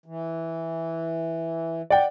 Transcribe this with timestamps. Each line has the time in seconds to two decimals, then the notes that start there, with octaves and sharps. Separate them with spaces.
0.06 E3
1.90 D5 F#5 G5